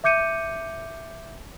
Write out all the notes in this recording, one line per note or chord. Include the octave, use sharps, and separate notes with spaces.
E5 D6 G6 C#7 D#7